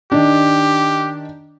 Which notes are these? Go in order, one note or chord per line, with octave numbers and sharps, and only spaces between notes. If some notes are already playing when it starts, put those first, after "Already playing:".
D#3 D4 G4